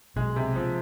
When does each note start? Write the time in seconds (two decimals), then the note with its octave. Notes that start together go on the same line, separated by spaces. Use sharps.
0.16 B1 B2 G#3
0.36 C3
0.56 F3